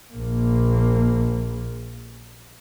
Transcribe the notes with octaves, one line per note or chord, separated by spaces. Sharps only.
A#1 A#3